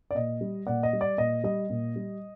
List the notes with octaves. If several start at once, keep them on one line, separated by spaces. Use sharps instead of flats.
D5
A#2 D#5
G3
A#2 D5 F#5
D#5
G3
D5
A#2 D#5
G3 D#5
A#2
G3